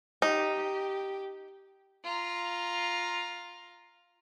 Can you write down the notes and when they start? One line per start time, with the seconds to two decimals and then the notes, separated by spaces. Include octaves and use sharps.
0.22 D#4 G4 G5
2.04 F4 A#5